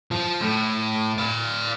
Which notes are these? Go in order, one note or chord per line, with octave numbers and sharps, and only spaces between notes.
F3
A2
D5 F5